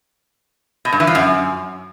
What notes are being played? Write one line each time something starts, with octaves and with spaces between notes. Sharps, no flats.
B2
G2
E3
F3
F#2